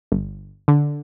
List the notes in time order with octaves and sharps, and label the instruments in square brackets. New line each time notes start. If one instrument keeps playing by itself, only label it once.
[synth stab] G1
D3